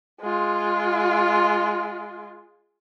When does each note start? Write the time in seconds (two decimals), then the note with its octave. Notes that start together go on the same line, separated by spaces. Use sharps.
0.21 G#3 F4